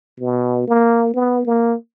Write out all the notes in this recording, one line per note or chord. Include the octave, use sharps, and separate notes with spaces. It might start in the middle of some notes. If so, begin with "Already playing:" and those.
B2
A#3
B3
A#3